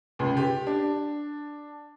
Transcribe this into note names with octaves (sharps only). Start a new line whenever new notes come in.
C#2
G4
D4